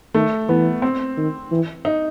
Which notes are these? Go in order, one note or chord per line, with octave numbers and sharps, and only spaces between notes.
D#3 A3
E3 B3
C4
D#3
E3
D#4